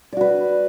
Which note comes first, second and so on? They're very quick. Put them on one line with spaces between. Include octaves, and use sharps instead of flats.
D5 F#4 B4